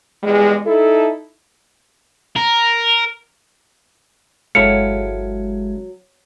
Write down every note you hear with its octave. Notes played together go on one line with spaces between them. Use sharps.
E2 G3 G#3
D#4 E4 A4
A#4
G1 F#3 G#3 E4 A4 F5 C#7